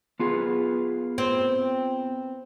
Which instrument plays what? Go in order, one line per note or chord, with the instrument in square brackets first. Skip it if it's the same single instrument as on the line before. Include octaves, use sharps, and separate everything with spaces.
[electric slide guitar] B3 F4 G#4
[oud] C4